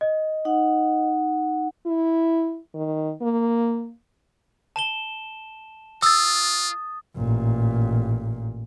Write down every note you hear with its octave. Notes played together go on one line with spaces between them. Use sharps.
D#5
D#4 F#5
E4
D#3
A#3
A5 E7 G7
F4 D#6 E6 A6
A1 A#2